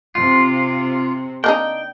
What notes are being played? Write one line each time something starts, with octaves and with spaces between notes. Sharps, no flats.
C3 F4
A#3 D4 D#4 G5